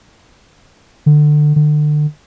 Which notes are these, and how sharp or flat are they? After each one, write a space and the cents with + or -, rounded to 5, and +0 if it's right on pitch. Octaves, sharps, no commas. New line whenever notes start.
D3 +25
D3 +35